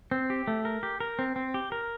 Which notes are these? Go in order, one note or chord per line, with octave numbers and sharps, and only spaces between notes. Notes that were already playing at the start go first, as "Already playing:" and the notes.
C4
G4
A3
A#4
G4
A#4
C4
C4
G4
A#4